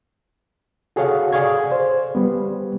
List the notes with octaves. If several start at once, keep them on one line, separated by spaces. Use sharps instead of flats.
F#4 G#4 A4 C#5 F5 F#5
G#4 D5 F5 C#6 G#6
C5
G3 B3